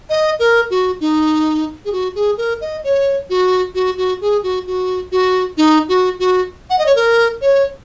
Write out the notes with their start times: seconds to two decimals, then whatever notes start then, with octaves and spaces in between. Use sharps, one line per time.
0.10 D#5
0.39 A#4
0.70 F#4
1.01 D#4
1.85 G#4
1.92 F#4
2.15 G#4
2.37 A#4
2.61 D#5
2.84 C#5
3.30 F#4
3.75 F#4
3.98 F#4
4.21 G#4
4.43 F#4
4.67 F#4
5.12 F#4
5.57 D#4
5.88 F#4
6.19 F#4
6.70 F#5
6.79 D#5
6.86 C#5
6.96 A#4
7.41 C#5